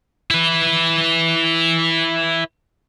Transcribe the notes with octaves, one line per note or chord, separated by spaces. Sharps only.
E4 B4